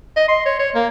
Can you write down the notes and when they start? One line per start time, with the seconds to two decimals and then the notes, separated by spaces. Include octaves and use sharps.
0.16 D#5
0.28 C6
0.45 C#5
0.59 C#5
0.75 A#3